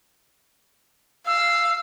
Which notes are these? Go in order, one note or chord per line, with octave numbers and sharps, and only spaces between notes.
F5 E6